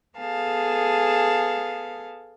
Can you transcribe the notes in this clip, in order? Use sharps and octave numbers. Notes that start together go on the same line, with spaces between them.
B3 G#4 A4 F5 A5